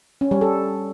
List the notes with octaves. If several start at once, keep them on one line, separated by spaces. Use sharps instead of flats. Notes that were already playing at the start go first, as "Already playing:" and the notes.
C#4
G3
A4